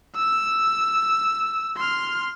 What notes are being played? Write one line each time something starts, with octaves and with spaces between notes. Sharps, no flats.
E6
C6 F6